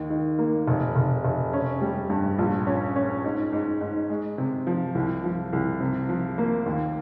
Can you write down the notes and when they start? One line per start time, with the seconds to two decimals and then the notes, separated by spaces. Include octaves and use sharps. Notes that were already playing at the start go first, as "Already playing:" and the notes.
Already playing: D#2 D#3
0.10 D#3
0.39 A#3
0.68 F1
0.95 F1
1.25 F1
1.53 C#4
1.81 G3
2.10 G2
2.38 A#1
2.67 C#4
2.96 C#4
3.24 G#2
3.52 G#2
3.81 G#2
4.10 G#3
4.38 C3
4.67 F3
4.95 C2
5.24 F3
5.53 C2
5.81 C3
6.09 F3
6.38 A#3
6.66 D#2